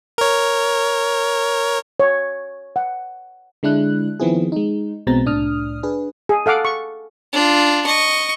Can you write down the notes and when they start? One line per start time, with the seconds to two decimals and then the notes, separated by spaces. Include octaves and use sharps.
0.18 A#4 C#5
2.00 C#5
2.76 F#5
3.63 D3 G#3 D4 E4 F#6
4.20 D#3 F3 B3 C4 E4 G#4
4.52 G#3 D#4
5.07 B1 B2 G#3 C4 A#5 A6
5.26 C2 A2 D4 D#6 F6
5.83 D4 G#4 B4
6.29 G#4
6.46 A4 F5 F#5 D6
6.65 C#6
7.33 D4 F4
7.86 D#5 C#6